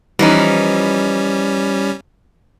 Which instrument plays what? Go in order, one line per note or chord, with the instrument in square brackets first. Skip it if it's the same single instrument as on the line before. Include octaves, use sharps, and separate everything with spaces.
[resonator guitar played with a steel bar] E3 F3 D#4 [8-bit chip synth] G3 C#4